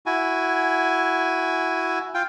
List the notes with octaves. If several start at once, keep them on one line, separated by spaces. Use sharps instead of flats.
E4 F#4 G#5
F4 G5